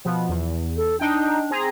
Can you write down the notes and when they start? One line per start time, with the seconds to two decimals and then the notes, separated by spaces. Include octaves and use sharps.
0.05 B2 F3 B3
0.29 E2
0.76 A4
0.99 D4 D#4 G5
1.50 C4 G#4 A#5